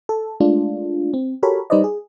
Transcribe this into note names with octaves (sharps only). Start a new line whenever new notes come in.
A4
G#3 A3 D4 F4
C4
F#4 G4 A4 A#4 C#5 B5
G3 D#4 B4 C5 D5 D#5
G#4